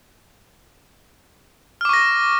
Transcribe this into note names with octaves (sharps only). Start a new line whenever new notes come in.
C#6 D6 F6 A#6